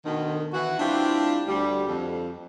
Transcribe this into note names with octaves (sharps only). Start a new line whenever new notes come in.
D2 B2 D3 D#3
E3 F#4 F#5
G3 C4 D4 E4 F4 G4
D2 G3
F2